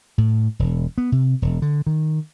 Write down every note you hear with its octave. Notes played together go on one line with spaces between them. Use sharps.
A2
E1
B3
C3
E1
D3
D#3